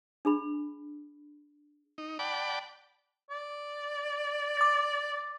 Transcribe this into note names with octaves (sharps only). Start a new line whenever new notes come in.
D4 G#4 B5
D#4
D5 F#5 G5 A5 B5 D6
D5
D6 A6